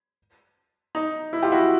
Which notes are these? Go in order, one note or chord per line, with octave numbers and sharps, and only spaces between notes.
D#4
E4
F4 G4
E4 F#4